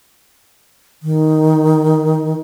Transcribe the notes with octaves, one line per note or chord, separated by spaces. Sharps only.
D#3